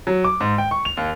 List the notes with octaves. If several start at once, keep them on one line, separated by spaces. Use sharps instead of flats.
F#3
D6
G#2
G5
C#6
F7
D#2